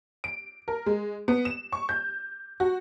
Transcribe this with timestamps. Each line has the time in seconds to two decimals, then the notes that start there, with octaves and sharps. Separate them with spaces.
0.24 D7
0.68 A#4
0.86 G#3
1.28 B3
1.45 E7
1.72 C#6
1.89 G6
2.60 F#4